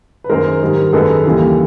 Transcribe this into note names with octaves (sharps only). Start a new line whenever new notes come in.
B4
F#2 D#3 G#3 A#4 C5
G#2 D#3 G3
F#2 D#3 G#3 A4 B4
D#2 C#3 E3 G3